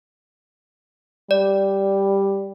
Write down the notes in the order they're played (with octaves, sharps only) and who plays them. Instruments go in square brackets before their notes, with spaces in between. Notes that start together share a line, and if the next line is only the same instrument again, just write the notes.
[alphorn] G3 [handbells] D5